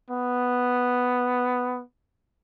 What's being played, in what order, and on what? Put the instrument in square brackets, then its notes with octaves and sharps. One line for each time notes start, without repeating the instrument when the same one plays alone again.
[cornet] B3